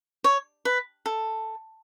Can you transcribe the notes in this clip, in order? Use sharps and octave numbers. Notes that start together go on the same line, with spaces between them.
C#5
B4
A4